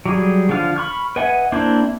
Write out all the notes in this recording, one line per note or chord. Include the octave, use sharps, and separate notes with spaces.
F#3 G3 G#4
D3 F3 F4 F5 F6
B5 C#6 F6
B4 D#5 E5 F#5 G#5
A#3 C4 D4 E4 C5